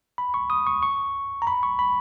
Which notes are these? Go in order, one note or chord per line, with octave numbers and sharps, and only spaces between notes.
B5
C#6
D#6
C#6
C#6
A#5
B5
C#6
B5